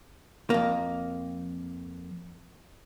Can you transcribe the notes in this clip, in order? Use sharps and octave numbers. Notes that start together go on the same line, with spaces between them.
F2 A#3